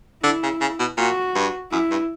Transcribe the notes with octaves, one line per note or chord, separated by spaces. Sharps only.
D3 E4
C#3
C#3
B2
A#2 F#4
G2
F#2 E4
G2